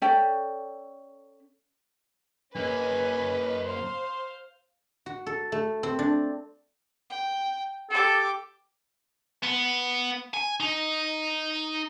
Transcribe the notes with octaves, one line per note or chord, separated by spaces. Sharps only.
C#4 A4 D5 G5
F#2 A#3 C#4 B4 D#5 G#5
C5 F5 C6
F#4
A4
A3
C4
D4
G5
G4 A4 D6
B3
G#5
D#4